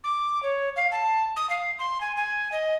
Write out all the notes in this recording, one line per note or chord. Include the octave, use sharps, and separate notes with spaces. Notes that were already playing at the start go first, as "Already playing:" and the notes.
D6
C#5
F5
A5
D#6
F5
C6
G#5
G#5
D#5